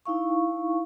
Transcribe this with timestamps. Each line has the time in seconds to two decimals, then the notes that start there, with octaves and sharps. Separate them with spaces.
0.05 D#4 E4 F5 C#6